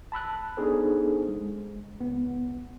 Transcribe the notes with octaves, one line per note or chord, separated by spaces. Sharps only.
A5 B5 E6 F#6
B3 D4 D#4 G#4 A4 C5
G#3
C#2 B3